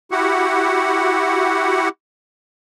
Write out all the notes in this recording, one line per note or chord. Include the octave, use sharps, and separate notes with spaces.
E4 F#4 G4 F#5